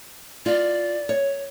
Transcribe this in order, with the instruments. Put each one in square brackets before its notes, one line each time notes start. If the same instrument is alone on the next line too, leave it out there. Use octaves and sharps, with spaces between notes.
[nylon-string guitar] F4 [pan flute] D5
[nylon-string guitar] C#5